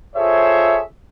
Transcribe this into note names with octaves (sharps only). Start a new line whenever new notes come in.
F4 G#4 A4 C5 C#5 E5